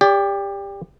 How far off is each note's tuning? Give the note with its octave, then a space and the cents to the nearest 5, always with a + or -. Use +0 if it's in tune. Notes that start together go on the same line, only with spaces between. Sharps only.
G4 +25 D5 -25